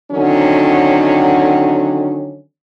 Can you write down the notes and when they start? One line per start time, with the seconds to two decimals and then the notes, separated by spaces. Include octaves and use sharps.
0.11 D3 D#3 F#3 C4 C#4